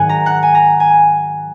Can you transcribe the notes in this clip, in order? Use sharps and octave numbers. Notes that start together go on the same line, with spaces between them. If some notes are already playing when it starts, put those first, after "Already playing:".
Already playing: G#2 D#3 F#3 F#5 G#5
A#5
F#5
G#5
A#5
G#5